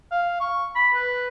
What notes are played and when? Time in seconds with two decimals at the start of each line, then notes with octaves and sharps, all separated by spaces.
0.11 F5
0.40 C#6
0.75 B5
0.94 B4